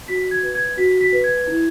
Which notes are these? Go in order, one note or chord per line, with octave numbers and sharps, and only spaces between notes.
F#4 B6
G#6
B4
G#6
F#4 B6
B6
B4
G#6
E4